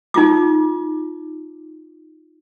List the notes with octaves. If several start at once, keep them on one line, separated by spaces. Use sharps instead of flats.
D#4 F4 D6